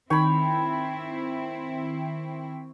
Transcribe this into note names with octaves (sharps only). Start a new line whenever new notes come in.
D#3 C4 E4 C#5 G5 B5